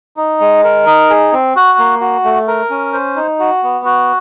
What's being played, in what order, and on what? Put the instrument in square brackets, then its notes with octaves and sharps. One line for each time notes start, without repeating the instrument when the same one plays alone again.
[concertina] D#4
G#3
A#4
D#4
G#4
C4
F#4
A#3
F#4
A3
A#4
C#4
C5
D#4
F#4
B3
F#4